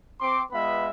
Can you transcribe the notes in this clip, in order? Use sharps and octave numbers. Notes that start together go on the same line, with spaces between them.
C4 C6 D6
G#3 B3 F4 B4 E5 B5